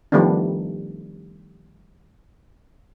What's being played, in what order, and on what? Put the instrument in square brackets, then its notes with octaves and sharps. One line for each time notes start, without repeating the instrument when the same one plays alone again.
[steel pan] D#3 F3 G3 A3 B3 D4